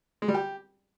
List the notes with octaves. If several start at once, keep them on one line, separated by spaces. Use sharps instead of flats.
G#3
G3
G4